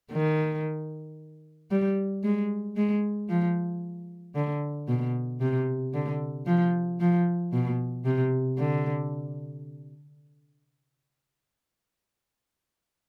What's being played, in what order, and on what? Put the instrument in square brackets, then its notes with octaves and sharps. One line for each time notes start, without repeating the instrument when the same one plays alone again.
[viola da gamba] D#3
G3
G#3
G#3
F3
D3
B2
C3
D3
F3
F3
B2
C3
D3